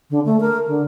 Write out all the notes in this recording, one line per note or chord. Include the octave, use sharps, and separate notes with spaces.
D3
A3
A#4
D3